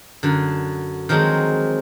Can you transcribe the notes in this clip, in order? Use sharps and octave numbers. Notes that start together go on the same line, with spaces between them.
F#2 D3
D#3 F3 F#3 G#3 C4